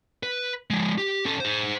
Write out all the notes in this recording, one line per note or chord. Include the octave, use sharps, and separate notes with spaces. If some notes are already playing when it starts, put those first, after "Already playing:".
B4
F3 G#3
G4
C#4 A4
G#4 C5